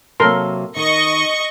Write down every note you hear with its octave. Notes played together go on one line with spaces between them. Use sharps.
C3 F#3 A#3 A4 A#4 C6
D#3 D#5 C#6